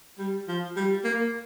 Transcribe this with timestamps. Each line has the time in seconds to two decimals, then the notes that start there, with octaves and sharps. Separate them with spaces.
0.19 G3
0.48 F3
0.77 G3
1.04 A#3